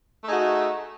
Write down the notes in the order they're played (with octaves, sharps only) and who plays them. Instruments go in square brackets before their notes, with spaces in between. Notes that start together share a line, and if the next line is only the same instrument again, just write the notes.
[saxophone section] A3
D#4
G#4
F#4